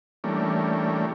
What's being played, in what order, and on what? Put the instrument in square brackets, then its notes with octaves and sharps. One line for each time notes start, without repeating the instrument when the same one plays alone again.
[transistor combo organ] E3 G3 A3 A#3 C#4 D4